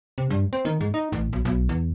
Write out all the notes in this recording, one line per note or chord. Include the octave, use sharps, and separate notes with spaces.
C3
G2
C4
D#3
G#2
D#4
A1
B1
B1
E2